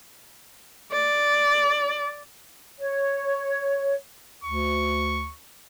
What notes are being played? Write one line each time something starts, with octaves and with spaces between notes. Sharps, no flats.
D5
C#5
D2 C#6